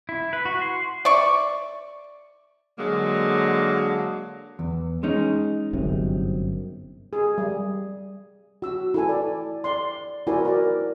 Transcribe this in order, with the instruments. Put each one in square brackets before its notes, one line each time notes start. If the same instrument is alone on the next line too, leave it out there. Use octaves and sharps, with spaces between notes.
[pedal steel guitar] E4
B4
F#4
C6
[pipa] D5 E5 C#6
[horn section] D3 F#3 G#3 A#3
[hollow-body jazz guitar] E2
G#3 C#4 D#4
[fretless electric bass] G1 F#2 C3
[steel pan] G#4
G3
F#4 E6
E4 A4 G#5
D5
D5 C6
E4 F#4 A#4 C5 D5 G#5
A#4 D5